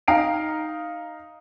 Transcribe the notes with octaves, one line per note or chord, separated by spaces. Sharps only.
D#4 F5 A#5 C7 D7